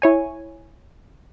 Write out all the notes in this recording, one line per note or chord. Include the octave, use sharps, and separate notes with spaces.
E4 C#5 G#5